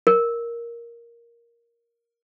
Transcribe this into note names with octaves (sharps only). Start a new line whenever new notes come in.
A#4